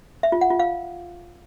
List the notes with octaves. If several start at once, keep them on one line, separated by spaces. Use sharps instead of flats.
E5
F4
F#5
F4
F5